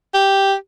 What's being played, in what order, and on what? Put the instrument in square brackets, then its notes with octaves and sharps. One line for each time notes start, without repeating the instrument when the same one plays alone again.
[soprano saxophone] G4